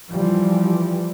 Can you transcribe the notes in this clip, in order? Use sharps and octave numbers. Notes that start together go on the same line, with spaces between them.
E3 F3 G3